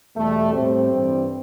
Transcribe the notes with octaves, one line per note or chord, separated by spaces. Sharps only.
E2 B2 G3 A3
A2 G3 C4
G2 E3 G3